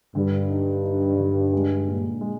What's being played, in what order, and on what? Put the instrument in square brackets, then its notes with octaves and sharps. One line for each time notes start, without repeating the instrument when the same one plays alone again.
[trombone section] G2 [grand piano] D3
[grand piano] D#4
D#4
D3
G#3
A#2
G#3